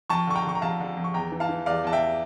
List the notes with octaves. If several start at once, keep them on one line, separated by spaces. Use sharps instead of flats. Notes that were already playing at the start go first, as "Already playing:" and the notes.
F2 A5 C#6
D3 C#6
G5 A#5
D3 C#6
A#5
F2 F5 A5
D3
F2
C#6
E2 G5 A#5
E3
F5 A5
E3
E2 D5 F5
E2 A5
E5 G5